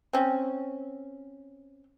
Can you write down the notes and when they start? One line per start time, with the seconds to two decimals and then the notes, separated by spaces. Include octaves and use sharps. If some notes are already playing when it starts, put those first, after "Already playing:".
0.13 C4 C#4